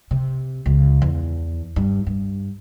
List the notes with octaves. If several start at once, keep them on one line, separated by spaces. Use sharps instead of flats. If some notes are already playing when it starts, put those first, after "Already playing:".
C3
C#2
E2
G2
G2